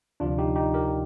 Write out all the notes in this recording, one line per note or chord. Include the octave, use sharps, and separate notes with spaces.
D2 C3 F3 D4 F4
D#4 G4
D#4 G4
G4 A#4